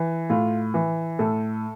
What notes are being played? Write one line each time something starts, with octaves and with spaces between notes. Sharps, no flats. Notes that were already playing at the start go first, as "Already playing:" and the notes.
Already playing: E3
A2 F4
E3
A2 A4